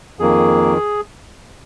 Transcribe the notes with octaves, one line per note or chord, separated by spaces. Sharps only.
F2 D#3 A#3 G#4